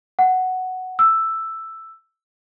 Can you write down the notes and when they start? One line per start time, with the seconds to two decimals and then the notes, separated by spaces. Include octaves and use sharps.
0.19 F#5
0.99 E6